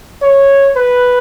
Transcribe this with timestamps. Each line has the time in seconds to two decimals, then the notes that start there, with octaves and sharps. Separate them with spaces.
0.22 C#5
0.76 B4